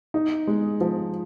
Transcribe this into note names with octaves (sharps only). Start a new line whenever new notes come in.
D#4
G#3
F3